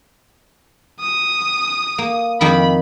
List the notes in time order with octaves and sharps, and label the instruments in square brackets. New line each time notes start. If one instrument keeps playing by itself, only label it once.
[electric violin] D#6
[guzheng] A#3
[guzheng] F2 D#3 A#3 [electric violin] B5